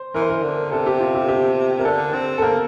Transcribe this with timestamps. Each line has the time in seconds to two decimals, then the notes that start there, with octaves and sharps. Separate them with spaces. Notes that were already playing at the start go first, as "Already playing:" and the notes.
Already playing: C5
0.14 E3 A#4
0.22 C5
0.30 A#4
0.43 D3
0.71 C3 A4
0.86 G4
1.00 F4
1.15 G4
1.29 G4
1.79 A#4
1.85 D3 A4
2.14 C4
2.38 A4
2.42 A#3 A#4